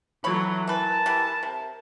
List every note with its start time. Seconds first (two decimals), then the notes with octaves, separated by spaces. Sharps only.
0.24 E3 F#3 A3 C#5 B5
0.67 E3 A#4 B4 A5
1.06 E3 G3
1.43 C3